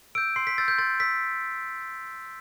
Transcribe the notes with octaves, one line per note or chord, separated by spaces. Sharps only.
E6 G6 D7
C6 C7
B6
E6 G6 A6
G6
C6 A6
E6 G6 B6